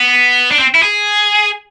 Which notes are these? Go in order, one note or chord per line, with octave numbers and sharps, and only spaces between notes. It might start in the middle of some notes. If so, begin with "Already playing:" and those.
Already playing: B3
D4
C4
E4
G#4